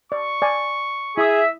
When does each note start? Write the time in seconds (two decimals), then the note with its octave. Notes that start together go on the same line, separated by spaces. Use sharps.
0.12 D5 C#6
0.42 D5 G#5
1.17 E4 G#4 E5 D#6